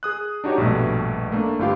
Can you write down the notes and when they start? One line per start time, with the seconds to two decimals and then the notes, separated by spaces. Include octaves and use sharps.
0.03 G#4 D#6 F#6
0.44 D4 D#4 F#4 G4 C#5
0.58 A#1 G2 B2 A3
1.32 A3 A#3 D4
1.59 G1 E4 F4 G4 F5